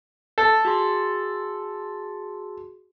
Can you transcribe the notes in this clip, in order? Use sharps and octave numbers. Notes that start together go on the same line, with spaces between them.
A4
F#4 G#4 C6